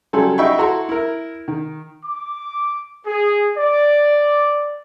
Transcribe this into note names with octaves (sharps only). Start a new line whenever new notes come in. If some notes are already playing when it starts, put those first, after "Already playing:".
C#3 F#3 G3 A4 G#5 C6
D#4 E5 F#5 G5 B5 C#6
E4 F#4 A4 A#5 C6
E4 A#4
D#3
D6
G#4
D5